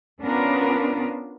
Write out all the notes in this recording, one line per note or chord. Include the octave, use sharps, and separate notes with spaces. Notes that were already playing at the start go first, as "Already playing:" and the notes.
B3 C#4 D4 F4 A#4 B4